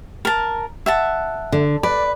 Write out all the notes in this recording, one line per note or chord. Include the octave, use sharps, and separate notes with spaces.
A#4 A5
E5 F#5 A5
D3
B4 D5